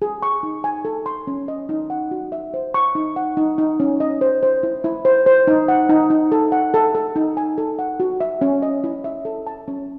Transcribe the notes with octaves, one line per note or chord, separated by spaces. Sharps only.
G#4
C#6
D#4
G#5
A4
C6
C#4
D#5
D#4
F#5
F#4
E5
C5
C#6
D#4
F#5
D#4
D#4
C#4
D#5
C5
C5
E4
E4
C5
C5
D#4
F#5
D#4
D#4
A4
F#5
A4
A4
D#4
G#5
A4
F#5
F#4
E5
C#4
D#5
E4
E5
A4
A5
C#4